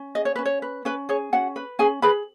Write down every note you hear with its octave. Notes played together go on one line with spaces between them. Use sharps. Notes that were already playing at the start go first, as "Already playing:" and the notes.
Already playing: C#4
G#4 D#5
C#5
C#4 B4
C#5
B4
C#4 B4
G#4 C#5
C#4 F#4 F#5
B4
C#4 G#4 G#5
G#4 B4 B5